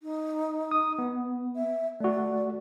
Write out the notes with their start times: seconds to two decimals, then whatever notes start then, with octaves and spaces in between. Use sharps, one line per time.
0.02 D#4
0.71 D#6
0.99 B3
1.56 E5
2.00 A3 F#4 D5